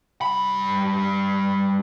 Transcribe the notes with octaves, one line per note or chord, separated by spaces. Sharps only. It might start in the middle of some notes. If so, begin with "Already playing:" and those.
G2 B5